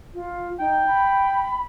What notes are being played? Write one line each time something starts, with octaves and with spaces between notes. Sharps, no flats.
F4
D#4 G5
B5